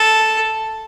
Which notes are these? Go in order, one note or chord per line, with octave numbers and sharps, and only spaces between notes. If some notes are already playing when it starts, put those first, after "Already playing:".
Already playing: A4